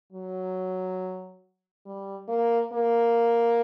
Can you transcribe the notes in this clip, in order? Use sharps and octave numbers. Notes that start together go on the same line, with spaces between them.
F#3
G3
A#3
A#3